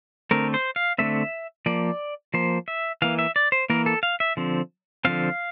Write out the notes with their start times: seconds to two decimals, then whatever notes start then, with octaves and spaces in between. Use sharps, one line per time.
0.31 D3 A3 C4 A#4
0.54 C5
0.76 F5
0.98 D3 A3 C4 E5
1.66 F3 A#3 D5
2.34 F3 A#3 C5
2.68 E5
3.02 E3 A#3 F5
3.19 E5
3.36 D5
3.52 C5
3.70 E3 A#3 A#4
3.86 A4
4.03 F5
4.20 E5
4.37 D3 F3 C4
5.05 D3 F3 C4 F5